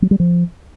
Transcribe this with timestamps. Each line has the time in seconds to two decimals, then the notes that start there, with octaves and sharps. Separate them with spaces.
0.02 F#3
0.11 G3
0.20 F3